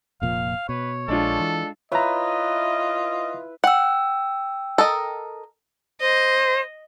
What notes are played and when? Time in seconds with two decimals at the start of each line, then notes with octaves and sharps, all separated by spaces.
0.22 F1 A#2 F3 F5
0.69 B2 B4 C#5
1.08 A#1 G#3 D4 F4 A4
1.40 E3
1.92 E4 F4 B4 C#5 D#5 E5 A#5
3.64 F#5 G5 E6
4.78 A4 A#4 D#5
6.01 C5 D#5